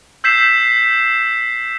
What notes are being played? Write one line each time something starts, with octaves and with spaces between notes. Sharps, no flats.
E6 G6 B6 C7 E7